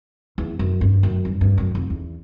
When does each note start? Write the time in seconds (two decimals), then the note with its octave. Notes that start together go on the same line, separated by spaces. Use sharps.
0.38 E2
0.59 F#2
0.81 G2
1.03 F#2
1.25 G2
1.41 G2
1.58 F#2
1.75 F2
1.90 E2